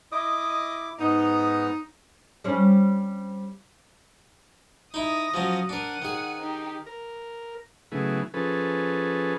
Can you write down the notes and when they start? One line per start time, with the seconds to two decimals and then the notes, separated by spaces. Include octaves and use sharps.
0.12 E4 D#5 D6
0.99 G#2 B3 D#4
2.44 G3 C4 C#4
4.94 D#4 E4 D#6 A#6
5.34 F3 F#3 C#4
5.69 D4 A#4 F#5 D#7
6.02 D#3 G#4
6.39 D#4 G4
6.86 A#4
7.92 C#3 F#3 A3 B3 E4 G#4
8.34 F3 C#4 G#4 A4 B4